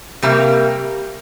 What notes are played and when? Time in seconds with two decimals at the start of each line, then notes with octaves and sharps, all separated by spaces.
0.22 C3 G3 A#3